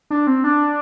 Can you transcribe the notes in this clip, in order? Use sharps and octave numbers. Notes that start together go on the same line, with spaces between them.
D4
C4
D4